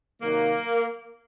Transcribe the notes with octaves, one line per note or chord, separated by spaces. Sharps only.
C3 D#3 F#3 A#3